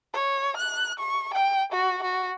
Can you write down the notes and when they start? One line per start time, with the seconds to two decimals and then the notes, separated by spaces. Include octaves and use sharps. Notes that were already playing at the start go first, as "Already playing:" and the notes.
0.14 C#5
0.57 F#6
0.99 C#6
1.34 G5
1.72 F#4
2.03 F#4